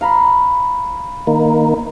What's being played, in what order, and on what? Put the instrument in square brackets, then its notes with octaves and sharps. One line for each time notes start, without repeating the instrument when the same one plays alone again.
[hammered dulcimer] F5 A#5 B5
[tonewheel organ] D#3 A#3